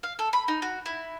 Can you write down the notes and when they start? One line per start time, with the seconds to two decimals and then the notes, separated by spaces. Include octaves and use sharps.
0.03 F5
0.19 A4
0.33 B5
0.48 D#4
0.62 F#4
0.86 E4